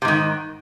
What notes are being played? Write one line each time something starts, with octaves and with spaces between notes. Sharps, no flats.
G#2 C3 D#3